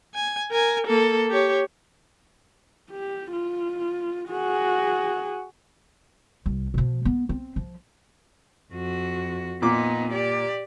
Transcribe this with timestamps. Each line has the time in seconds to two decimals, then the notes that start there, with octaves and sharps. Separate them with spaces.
0.15 G#5
0.51 A#4 G#5
0.87 A#3 A4
1.29 G4 C#5
2.91 G4
3.32 F4
4.29 F#4 G#4
6.46 C2
6.74 B2 F3
7.05 B3
7.29 C4
7.56 F3
8.72 F2 F#4
9.62 A#2 B3 D#4 D6
10.12 G4 D5